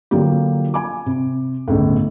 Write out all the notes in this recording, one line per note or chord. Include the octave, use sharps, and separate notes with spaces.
D3 F3 F#3 A#3 G4
G#5 D6
C3
G1 C#2 A2